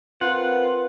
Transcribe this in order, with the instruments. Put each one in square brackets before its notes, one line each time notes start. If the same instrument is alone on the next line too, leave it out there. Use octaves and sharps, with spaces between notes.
[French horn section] C4 A#4 B4 [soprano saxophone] F4 [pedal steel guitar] F#5